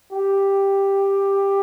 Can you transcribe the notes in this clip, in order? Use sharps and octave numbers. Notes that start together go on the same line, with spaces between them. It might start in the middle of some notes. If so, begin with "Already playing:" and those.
G4